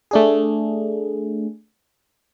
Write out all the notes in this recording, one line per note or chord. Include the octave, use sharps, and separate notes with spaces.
A3 D4 G#4